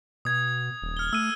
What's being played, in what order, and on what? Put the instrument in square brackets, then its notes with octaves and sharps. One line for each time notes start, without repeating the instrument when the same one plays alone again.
[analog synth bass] B2 [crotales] D#6 G#6
[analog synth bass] D#1
[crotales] F6 G7
[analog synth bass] A3 [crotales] E6 D#7